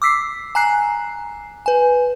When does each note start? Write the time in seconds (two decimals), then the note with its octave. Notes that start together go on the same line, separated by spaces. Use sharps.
0.02 D6 E6 B6 C7
0.55 G#5 A#5 F#6 C7
1.66 B4 G#5